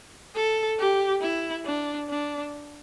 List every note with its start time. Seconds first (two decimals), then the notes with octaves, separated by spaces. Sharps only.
0.35 A4
0.79 G4
1.22 E4
1.65 D4
2.09 D4